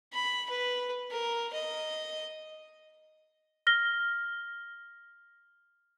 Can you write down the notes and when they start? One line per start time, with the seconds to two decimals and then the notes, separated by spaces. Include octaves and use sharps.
0.13 B5
0.49 B4
1.11 A#4
1.53 D#5
3.67 F6 A#6 G7